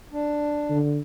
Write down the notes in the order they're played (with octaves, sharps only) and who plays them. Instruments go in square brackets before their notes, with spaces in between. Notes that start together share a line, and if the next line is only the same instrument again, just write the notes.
[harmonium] D4
[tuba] D3